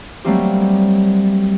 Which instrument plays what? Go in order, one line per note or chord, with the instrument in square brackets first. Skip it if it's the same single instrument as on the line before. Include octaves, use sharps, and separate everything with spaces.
[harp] F#3 G3 A3 A#3 C4 G4